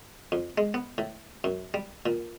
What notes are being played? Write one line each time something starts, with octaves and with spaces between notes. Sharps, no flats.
F2
G#3
B3
A2
F#2
G3
A#2